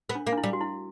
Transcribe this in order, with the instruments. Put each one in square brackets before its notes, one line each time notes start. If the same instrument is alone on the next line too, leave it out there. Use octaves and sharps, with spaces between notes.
[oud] B3
[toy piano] D4
[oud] A#3
[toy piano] D4
E4
[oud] G3
[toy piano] F#4
E4